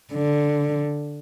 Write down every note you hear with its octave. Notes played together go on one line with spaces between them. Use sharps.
D3